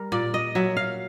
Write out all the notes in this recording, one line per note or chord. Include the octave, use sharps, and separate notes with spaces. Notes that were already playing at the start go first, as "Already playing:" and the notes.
Already playing: G3 A#4
A#2 D5
D#5
F#3 E5
F5